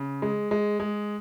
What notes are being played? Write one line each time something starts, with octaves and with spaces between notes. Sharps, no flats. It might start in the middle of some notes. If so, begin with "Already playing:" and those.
Already playing: C#3
G#3
G#3
G#3